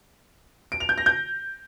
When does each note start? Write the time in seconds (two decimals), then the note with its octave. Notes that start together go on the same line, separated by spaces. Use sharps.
0.72 D7
0.80 F7
0.89 G6
0.98 A#6
1.06 G6